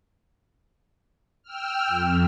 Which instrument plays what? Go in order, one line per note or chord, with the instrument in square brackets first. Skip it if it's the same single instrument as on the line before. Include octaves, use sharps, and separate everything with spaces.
[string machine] G5 E6 F6
F2